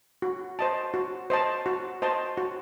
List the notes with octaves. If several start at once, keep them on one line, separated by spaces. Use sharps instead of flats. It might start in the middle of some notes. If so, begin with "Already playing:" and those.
F#4
C5 D#5 A5
F#4
C5 D#5 A5
F#4
C5 D#5 A5 C6
F#4